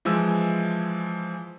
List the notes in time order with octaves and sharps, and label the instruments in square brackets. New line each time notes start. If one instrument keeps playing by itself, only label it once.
[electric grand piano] E3 F3 G#3 G#5 E6